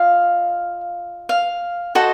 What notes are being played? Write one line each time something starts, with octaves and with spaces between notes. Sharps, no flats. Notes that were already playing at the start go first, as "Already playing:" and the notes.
Already playing: F4 D#5 F5
F5
F#4 A4 C5 D#5